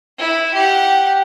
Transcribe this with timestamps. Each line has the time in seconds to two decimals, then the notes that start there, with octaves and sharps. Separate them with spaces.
0.18 E4
0.54 G4 F#5